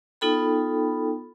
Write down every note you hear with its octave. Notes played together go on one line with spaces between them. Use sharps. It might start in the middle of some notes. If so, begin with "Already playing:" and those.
B3 D#4 F4 A4 G5 B5